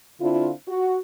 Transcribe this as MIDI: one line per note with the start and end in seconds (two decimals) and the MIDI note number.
0.21 0.51 50
0.21 0.51 60
0.21 0.51 62
0.21 0.51 64
0.21 0.51 65
0.68 0.97 66